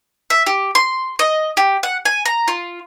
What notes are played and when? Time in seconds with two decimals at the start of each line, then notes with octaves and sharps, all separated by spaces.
0.30 E5
0.46 G4
0.75 C6
1.19 D#5
1.57 G4
1.83 F#5
2.05 G#5
2.25 A#5
2.48 F4